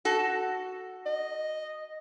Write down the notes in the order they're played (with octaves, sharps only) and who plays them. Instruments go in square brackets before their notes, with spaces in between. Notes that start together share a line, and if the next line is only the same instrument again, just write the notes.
[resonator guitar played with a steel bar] F#4 A4
[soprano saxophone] D#5